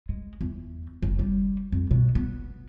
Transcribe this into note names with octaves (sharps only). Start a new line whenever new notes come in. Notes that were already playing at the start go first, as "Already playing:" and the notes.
G#3
E2
F#1
G3
F2
B2
B3